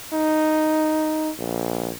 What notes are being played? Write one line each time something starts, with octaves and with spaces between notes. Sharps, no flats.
D#4
A#1